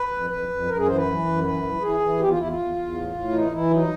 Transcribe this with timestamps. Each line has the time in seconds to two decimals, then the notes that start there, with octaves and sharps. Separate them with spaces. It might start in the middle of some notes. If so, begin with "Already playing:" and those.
Already playing: B4
0.11 F2
0.30 F2 B4
0.49 F2
0.68 F#2 A#4
0.77 G#4
0.87 E3 C5
0.96 B4
1.05 E3
1.24 F#2
1.43 E3 B4
1.63 E3
1.81 E3 G#4
2.00 E3
2.19 E2 G4
2.29 F4
2.38 E2 E4
2.48 F4
2.57 E2
2.76 E2
2.95 A2
3.14 A2
3.33 E3 D#4
3.52 E3 E4
3.71 F#3 D#4